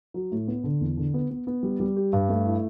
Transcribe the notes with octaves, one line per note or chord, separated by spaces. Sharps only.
F#3
A2
B3
D3
E2
D3
B3
B3
B3
G3
G3
G4
G2
A3
E4